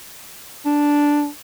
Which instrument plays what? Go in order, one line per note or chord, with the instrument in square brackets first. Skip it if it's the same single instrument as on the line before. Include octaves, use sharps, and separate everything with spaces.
[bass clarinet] D4